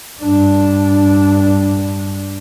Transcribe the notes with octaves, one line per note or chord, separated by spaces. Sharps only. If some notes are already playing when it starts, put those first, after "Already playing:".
G2 D4